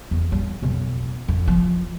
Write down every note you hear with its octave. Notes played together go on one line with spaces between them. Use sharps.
E2
G3
B1 F2
F2
F3